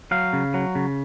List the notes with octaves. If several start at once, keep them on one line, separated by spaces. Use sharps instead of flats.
F#3 F5
C#3
F#3
C#3